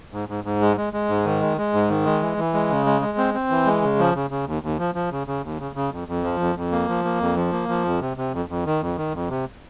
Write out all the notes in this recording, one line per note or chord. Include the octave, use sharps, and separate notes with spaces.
G#2
G#2
G#2
G#3
G#3
G#3
G#2
D#3
G#3
G#3
G#2
D#3
G#3
E3
E3
G#3
C#3
G#3
G#3
C4
C4
E3
G#3
C#3
F3
C#3
C#3
D#2
D#2
F3
F3
C#3
C#3
D#2
C#3
C#3
F2
F2
F3
F2
F2
A#3
F3
A#3
F2
F3
A#3
F3
F2
C3
C3
F2
F2
D#3
F2
D#3
F2
C3